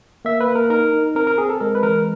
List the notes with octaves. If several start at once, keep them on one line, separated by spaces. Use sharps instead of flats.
A#3 E5
B4
A#3
A#4
D#4 A#4
D#4
C4 A#4
A#4
C4 G#4
A4
G#3 A#4
B4
E3 A#4